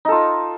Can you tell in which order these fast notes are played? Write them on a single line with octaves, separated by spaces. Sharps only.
D#4 A4 F4